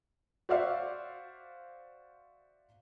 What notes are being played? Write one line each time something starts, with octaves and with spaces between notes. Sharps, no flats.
F#4 C5 D5 E5 F5